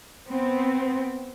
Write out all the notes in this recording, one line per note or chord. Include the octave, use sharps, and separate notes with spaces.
B3 C4